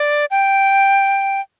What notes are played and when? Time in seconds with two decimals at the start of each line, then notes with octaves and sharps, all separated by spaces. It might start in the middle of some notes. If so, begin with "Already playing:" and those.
Already playing: D5
0.31 G5